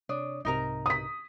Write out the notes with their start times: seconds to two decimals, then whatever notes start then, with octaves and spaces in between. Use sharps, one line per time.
0.09 C3 D4 C#5 D#6
0.45 C2 G#2 C3 D#4 A#4 A#5
0.86 D#6 B6